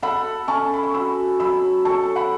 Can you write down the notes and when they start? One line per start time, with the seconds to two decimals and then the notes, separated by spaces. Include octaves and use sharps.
0.02 A4 F#5 B5
0.48 C#4 A5 C#6
0.74 B5
0.83 C#6
0.94 F#4 B5 E6
1.40 F#3 B5 E6
1.85 A4 A5 C#6
2.16 F#5 B5